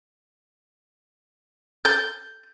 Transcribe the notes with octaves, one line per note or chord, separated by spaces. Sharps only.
G6